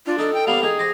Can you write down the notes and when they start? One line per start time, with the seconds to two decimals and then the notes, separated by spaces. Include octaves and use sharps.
0.07 D4 F4
0.19 D#4 A4
0.34 G5
0.47 G3 A#3 B3 F5 F7
0.63 D#4 G#4 G5
0.79 C5 D6 A#6